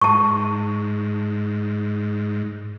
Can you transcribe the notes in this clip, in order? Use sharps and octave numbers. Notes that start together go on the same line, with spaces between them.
G#2 A5 C#6